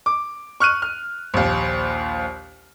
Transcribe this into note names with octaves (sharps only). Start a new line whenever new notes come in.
D6
C#6 F6 F#6 D#7
F6
A#1 D#2